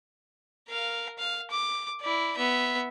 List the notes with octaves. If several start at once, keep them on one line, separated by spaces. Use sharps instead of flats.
A#4 F5
F5
D6
E4 D5
B3 E5